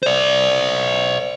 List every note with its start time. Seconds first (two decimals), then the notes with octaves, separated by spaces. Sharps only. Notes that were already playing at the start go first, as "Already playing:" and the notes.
0.03 C5 D5